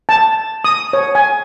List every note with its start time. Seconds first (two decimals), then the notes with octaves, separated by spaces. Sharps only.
0.09 A5
0.64 D#6
0.93 C#5
1.15 G#5